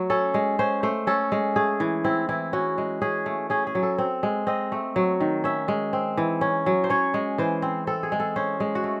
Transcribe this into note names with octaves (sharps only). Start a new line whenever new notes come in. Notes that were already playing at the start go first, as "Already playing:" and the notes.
Already playing: F#3 A3
C#4 A4
G#3
C#4 C5
A3 C5
C#4 A4
G#3
A3 G#4
E3
C4 E4
E3 E4
C#4 F#4
G#3
C#4 G#4
A3
C#4 G#4
G#4
F#3
A4
C4
G#3
C4 D#5
A3
F#3
D#3
C#4 E5
G#3
C4
E3
C#4
F#3
C5
C#4 C#5
G#3
E3 C5
C4
C4 A4
G#4
G#3
A4
C#4 C5
G#3
F#4
A3